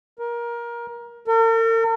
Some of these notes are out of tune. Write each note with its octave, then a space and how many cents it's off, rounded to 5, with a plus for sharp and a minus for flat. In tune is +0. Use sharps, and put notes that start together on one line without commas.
A#4 +20
A#4 -45